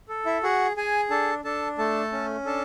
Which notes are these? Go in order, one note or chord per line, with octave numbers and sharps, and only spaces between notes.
A4
E4 E5
F#4 G#4 F#5
G#4 G#5
D4 A4 A5
D4 A4 A5
A3 A4 A5
C#4
D4 A4 A5